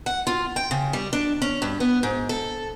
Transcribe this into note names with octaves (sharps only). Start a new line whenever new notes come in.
F#5
F4
G5
C#3
G3
D4
C#4
G2
B3
G#2
A4